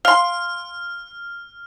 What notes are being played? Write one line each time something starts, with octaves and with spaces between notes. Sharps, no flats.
F5 C6 F6